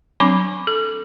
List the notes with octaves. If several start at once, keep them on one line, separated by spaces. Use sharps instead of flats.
F#3 C4 D4 B5 D6
A4